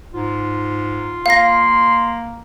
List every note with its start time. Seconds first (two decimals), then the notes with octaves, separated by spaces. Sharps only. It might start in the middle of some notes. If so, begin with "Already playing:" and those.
0.14 G#2 F4
1.26 A#3 F5 C6 A#6